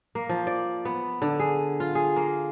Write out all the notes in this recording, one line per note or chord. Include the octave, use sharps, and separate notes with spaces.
A#3
F3
D5
B3
D3
G#4
F4
G#4
A#3